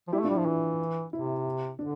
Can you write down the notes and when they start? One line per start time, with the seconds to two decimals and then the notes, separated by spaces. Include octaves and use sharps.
0.08 F3
0.12 G3 E4 G4
0.21 A3
0.24 D4 F4
0.29 G3
0.35 E4
0.38 F3
0.46 E3
1.13 C3 E4
1.79 D3 D4